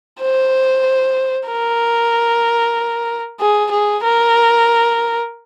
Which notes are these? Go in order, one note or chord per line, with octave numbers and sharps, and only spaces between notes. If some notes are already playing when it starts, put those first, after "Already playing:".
C5
A#4
G#4
G#4
A#4